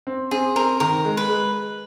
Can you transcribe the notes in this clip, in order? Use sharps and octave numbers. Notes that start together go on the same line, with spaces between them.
C4
C4 G#4
C4 A#4
D#3 A#4
G#3
B4
G#3